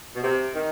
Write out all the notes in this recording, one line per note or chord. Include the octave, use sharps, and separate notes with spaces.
B2
C3
D#3